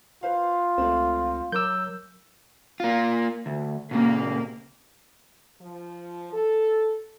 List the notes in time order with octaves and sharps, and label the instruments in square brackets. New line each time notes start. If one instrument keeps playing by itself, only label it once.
[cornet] F4 [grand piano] B4 C5 F5
[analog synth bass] C#2 [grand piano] A3 C4
[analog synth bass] F#3 [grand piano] A#4 D6 [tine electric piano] E6 G6
[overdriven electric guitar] A#3 F4
D2
[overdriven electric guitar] A#2 C#3 [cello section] A#3
[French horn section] F3
A4